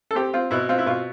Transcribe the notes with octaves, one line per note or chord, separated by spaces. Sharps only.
A4
C4 G4
C4 F4
B2 E4
C4 F4
E4
B2 F4